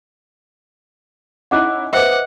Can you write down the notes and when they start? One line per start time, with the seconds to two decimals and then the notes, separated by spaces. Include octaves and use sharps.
1.51 C#4 D#4 E4 F#5 D6 F#6
1.93 B4 C5 D#5 E5 F#5 D6